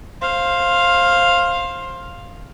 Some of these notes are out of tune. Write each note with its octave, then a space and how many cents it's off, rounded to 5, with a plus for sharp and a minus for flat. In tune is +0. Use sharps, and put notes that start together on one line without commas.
C5 +20 F5 +0